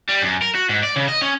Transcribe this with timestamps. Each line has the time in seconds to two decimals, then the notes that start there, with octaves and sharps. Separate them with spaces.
0.09 G3
0.22 F#2
0.42 A#4
0.55 F#4
0.69 G#2
0.83 D5
0.96 C#3
1.08 D#5
1.22 C#4